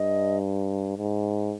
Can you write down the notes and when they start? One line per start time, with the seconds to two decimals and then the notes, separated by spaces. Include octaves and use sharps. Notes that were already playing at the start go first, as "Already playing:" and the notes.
Already playing: G2 D#5
0.97 G#2